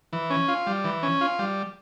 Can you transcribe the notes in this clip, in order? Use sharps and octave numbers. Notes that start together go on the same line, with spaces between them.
E3
C#4
F4
G3
E3
C#4
F4
G3